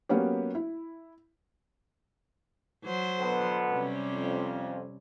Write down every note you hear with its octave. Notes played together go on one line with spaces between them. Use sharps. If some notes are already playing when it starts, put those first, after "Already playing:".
F#3 A#3 B3 C#4 G4
E4
F#3 C5
B2 D3 B3
C3 G3 C#4
F2